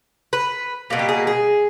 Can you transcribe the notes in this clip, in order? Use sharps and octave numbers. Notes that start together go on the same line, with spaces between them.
B4
B2 G3 A#3
G4
G#4
G#4